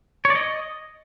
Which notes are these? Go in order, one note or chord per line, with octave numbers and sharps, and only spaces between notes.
C#5
D5
D#5